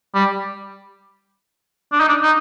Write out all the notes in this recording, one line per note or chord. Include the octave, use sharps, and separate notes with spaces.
G3
D4
D#4
D4
D#4